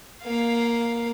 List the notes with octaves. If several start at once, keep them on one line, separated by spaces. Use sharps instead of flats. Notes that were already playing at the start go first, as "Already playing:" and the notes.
A#3 F5